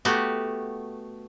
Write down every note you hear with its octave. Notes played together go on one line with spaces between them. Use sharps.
A3 B3 F#4 G4